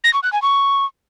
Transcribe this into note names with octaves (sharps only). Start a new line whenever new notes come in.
A#6
C#6
F#6
G#5
C#6